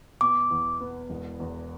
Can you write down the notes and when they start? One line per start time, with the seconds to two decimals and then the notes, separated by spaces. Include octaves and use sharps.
0.21 B2 D6
0.51 E2
0.80 B3
1.10 E1
1.40 E2